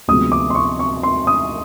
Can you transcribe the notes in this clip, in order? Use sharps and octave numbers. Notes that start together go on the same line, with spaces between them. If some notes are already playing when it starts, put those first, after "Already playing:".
D2 C3 F3 G#3 B3 D#6
D6
C6
C#6
C#6
C6
D#6